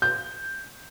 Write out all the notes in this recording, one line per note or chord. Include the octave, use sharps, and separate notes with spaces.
G6